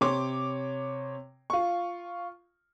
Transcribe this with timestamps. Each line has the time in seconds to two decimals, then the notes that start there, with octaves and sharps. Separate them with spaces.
0.01 C3 C#5 C6 D6
1.50 F4 C#6